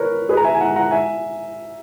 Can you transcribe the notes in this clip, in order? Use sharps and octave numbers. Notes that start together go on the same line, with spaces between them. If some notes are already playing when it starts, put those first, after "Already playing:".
Already playing: A#4 B4 C#5
G#4 B4
A#5
E5 G#5
G#5
F#5 A#5
F#5 A#5
E5 G#5